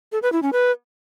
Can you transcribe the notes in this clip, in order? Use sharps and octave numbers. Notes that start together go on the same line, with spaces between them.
A4
B4
E4
C#4
B4